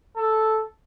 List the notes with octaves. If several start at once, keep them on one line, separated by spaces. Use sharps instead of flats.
A4